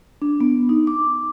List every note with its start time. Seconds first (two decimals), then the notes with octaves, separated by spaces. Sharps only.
0.22 D4
0.40 B3
0.69 D#4
0.87 D6